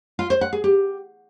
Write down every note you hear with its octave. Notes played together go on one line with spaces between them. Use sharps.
F4
C5
F#5
G#4
G4